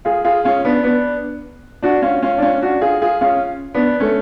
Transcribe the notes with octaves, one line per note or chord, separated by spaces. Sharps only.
F4 G#4
F4 G#4
C#4 F4
B3 D4
B3 D4
D4 F#4
C#4 F4
C#4 F4
D4
C#4 F4
D4 F#4
F4 G#4
F4 G#4
C#4 F4
B3 D4
A3 C#4